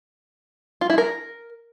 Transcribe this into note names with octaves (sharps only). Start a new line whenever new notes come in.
F4
E4
A#4